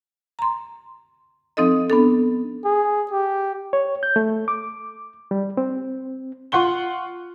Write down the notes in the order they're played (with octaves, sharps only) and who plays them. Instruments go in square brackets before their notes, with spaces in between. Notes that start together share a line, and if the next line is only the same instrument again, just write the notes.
[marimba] A#5 C6
F3 C4 D#4 A4 D#5
B3 D4 A4
[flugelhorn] G#4
G4
[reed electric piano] C#5
G6
A3
D6
G3
C4
[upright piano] F4 F#5 C#6 G7